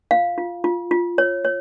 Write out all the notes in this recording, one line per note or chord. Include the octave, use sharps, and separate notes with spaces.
F4 F5
F4
F4
F4
C#5
C#5